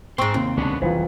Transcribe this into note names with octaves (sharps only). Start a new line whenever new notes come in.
G#2 C4 G5 C6 C#6
D#2 C3
C#2 D3 B3 C#4 D4
F#1 C2 F2 E3 F4 B4 C5